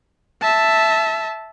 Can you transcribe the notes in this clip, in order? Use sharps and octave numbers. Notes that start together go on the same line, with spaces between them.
E5 A5